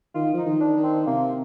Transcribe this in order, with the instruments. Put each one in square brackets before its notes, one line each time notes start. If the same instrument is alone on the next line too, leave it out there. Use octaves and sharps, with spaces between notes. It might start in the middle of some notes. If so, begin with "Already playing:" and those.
[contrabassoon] D#3 [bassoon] F4
[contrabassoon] F3 [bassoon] D#4
[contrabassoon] D#3
[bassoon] D4
[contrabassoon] D#3
[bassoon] C4
[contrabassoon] C3 [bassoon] A#3